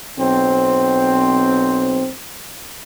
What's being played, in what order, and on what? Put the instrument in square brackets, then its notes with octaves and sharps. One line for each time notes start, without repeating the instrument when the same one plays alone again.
[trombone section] B1 C4